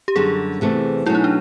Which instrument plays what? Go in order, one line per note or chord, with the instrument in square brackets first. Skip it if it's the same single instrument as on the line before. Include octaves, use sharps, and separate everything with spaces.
[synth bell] G4
[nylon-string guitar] F#2 D3 G3 [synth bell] G#4
[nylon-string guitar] E2 C3 E3 A3
[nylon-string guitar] B2 F#3 A3 C#4 [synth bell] E4
[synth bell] D#4
D4